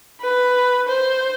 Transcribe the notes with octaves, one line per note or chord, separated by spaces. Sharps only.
B4
C5